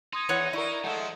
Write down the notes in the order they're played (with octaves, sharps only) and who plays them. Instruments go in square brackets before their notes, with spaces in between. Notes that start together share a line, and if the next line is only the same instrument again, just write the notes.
[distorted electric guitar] D#4 [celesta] C6 D#6 G#6
[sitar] E2 [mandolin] E4 C#5 F#5
[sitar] E4 A#4 [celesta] D5 C#6 [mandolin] D#6
[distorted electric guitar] F3 [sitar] G#3 A3 [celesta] F#5 C#7